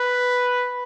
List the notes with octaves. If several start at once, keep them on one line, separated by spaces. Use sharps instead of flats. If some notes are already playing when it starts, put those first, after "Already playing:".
Already playing: B4